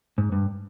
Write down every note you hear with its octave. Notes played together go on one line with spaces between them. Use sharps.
G#2
G2